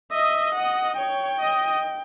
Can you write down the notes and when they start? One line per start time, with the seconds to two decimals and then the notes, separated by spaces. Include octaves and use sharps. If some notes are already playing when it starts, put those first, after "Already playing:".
0.12 D#5 E5
0.55 D#5 F#5
0.97 C#5 G5
1.41 D#5